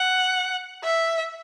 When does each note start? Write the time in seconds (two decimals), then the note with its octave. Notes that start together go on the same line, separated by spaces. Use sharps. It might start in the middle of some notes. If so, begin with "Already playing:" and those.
Already playing: F#5
0.84 E5